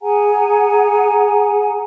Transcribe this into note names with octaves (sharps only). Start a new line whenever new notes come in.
G#4 F#5 G#5 A#5